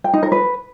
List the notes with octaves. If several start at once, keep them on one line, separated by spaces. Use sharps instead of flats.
G5
D#4
A#4
B4